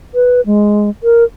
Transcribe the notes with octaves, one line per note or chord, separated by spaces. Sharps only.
B4
G#3
A#4